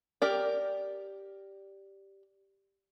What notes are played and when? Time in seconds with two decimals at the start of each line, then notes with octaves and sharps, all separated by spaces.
0.22 G4 A#4 D5